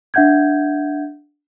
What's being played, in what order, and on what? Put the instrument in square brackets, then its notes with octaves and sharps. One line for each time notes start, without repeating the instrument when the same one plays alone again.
[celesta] D4 E5 F#5 G6 G#6